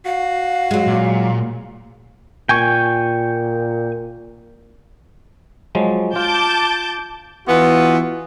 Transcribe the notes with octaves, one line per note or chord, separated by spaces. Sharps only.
F#4 F5
F#3 G#3
A#2
A#2 G5 G#5 C#6
F3 F#3 G#3
F4 A5 D6 G6
E3 B3 F4 F#4